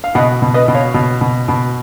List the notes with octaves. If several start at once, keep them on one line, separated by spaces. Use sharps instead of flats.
F5
B2 D#5 F#5
B2
B4 D#5
B2
C#5 F5
B2
B2
B2